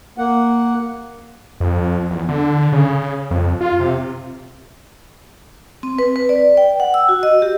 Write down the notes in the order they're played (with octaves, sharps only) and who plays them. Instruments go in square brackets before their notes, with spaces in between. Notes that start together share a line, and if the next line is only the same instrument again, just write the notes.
[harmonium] A#3 F#5
[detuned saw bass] F2
E2
D3
C#3
F2
F4
C3
[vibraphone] C4
B4
B4
D5
G5
F#5
E6
F#4
D#5
G4